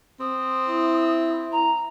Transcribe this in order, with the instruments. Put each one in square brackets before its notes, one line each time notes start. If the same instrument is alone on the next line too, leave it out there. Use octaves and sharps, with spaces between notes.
[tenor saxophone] C4 [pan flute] D#6
[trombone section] E4
[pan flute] A#5